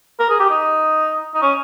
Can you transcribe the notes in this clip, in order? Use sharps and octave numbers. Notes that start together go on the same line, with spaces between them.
A#4
G#4
G4
D#4
D#4
C#4